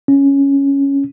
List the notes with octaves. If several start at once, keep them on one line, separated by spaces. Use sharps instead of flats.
C#4